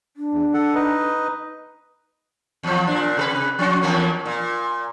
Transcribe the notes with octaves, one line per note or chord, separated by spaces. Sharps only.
D4
E2
A4 F#5
D#4 B4 D#5
E2 F3
A#2 D4
C3 A4 B4
F3 C#4 F#4
E2 A#3 C#4
A#2